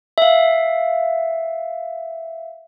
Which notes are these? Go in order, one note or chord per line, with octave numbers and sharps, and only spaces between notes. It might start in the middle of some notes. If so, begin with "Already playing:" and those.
E5 F5